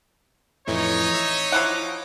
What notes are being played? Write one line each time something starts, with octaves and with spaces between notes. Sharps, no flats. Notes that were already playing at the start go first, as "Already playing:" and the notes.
F2 A2 E3 D#4 C#5
E5
F3 E4 F#5 D6